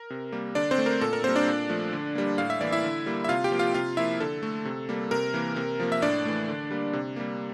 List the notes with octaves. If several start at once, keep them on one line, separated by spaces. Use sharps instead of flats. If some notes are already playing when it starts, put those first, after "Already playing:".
Already playing: A#4
C3
G3 A#3
D3 D4 D5
C4 C5
A3
A#4
A#2 A4
A#4
G3 A#3 C4 C5
D4 D5
A#2
F3 A3
D3
G3 A#3
A2 F5
E5
E3 A#3 D5
E4 E5
D3
G3 A#3
E5
C3 F4 F5
G4 G5
F3 A#3
F4 F5
C3 F4 F5
F3 A#3 E4 E5
D3 A4
A3
C3
G3 A#3
C3 A#4
E3 A#3
C3
F3 A#3
E5
A2 D4 D5
E3 A3
D3
G3 A#3
C3
G3 A#3